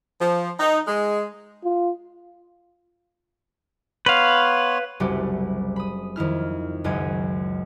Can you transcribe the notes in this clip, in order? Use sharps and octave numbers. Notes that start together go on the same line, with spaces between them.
F3
D#4
G#3
F4
B3 B4 C#5 F5 C6
F#1 C2 G3 F#4 G4
B5 D#6
F2 D#3 E4 F6
F#1 C#2 F#2 D#5 G#6 D#7